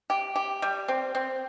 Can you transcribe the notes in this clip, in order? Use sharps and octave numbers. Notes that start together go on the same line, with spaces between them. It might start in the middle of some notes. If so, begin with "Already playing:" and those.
G4
G4
G3
C4
C4